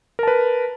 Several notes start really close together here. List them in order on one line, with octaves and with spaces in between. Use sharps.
A#4 A5 B4